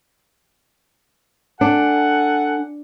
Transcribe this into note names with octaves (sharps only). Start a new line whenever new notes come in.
D4 A4 F#5 G#5